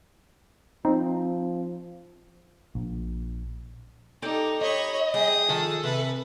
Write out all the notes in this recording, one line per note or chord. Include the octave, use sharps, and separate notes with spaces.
F3 C4 D#4
A#1
D#4 G4 A4 D5
C#5 D#5 B5
G3 G#4 D#6
D#3 F3 A4
C3 B4